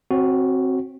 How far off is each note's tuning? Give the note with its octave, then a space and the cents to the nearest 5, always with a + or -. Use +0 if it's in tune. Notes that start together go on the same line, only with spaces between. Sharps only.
C4 +10 F#4 +0 C#5 -25